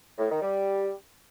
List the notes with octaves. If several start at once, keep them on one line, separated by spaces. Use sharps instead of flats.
A2
D#3
G3